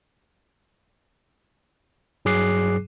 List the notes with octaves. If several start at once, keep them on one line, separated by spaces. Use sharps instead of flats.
G2 F#3 G#4 D6 F#6 C7